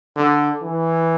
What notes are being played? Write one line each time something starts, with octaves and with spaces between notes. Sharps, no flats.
D3
E3